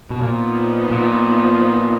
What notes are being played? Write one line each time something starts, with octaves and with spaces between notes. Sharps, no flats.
B2
A#2 F3 B3 D#4
A#2